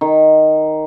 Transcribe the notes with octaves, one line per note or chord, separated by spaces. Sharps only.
D#3